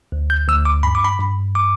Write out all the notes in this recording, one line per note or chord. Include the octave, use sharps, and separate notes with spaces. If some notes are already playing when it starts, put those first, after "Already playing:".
D2
G6
D2 E6
D6
G2 B5
D6
B5
G2
D6